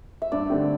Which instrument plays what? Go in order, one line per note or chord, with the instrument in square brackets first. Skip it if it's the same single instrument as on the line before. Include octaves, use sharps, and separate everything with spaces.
[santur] E5
[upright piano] G2 [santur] D5
[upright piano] D3 A3 C4 G4